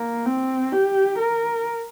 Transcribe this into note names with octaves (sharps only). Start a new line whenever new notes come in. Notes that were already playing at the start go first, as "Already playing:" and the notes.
Already playing: A#3
C4
G4
A#4